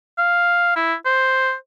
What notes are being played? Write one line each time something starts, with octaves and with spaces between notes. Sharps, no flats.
F5
E4
C5